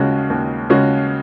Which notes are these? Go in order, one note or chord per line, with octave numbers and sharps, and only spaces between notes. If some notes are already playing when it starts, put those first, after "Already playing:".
Already playing: D#2 C#3 G#3 C#4 F#4
D#2
C#3 G#3 C#4 F#4